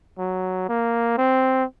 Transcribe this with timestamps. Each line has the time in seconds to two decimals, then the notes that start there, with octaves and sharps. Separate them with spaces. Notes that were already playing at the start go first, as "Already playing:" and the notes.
0.19 F#3
0.68 A#3
1.18 C4